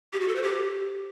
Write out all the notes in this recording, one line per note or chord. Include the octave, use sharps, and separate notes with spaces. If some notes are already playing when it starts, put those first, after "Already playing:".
G4
F#4
A4
C5
G4